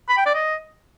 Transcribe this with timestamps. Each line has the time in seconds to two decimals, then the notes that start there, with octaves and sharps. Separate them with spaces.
0.09 B5
0.17 G5
0.26 D5
0.34 D#5